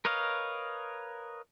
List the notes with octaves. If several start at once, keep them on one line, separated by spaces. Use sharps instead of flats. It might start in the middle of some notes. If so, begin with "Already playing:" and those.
A#4 B4 C#5 D#5 F5